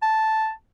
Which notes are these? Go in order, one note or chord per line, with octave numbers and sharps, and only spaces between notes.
A5